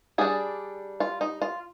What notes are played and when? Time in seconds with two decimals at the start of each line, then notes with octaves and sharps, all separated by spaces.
0.18 G3 D4 G#4
1.00 F4
1.21 D#4
1.42 F4